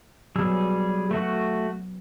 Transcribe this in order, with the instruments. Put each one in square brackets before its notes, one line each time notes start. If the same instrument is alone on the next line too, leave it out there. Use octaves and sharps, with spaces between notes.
[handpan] F#3 B3 [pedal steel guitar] G3 G#4 E6
[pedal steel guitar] A3 F#4 F#5